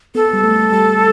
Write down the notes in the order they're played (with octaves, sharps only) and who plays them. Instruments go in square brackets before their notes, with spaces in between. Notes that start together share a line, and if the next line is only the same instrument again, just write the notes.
[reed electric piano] B3 [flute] A4
[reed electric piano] G3
A3
G3